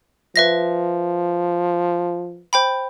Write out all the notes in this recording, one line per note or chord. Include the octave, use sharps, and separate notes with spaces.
F3 B4 E5 A#6
C5 G5 B5